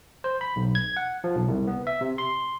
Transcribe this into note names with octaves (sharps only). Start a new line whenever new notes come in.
C5
B5
B1
G#6
F#5
F3
B1
C2
B3
E5
C3
C6